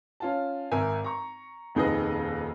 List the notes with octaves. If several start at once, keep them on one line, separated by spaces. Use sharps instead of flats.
C#4 F4 A5
G#1 A#4 E5 G#5
A#5 C#6
D#1 F2 D#4 G#4 B4 D#5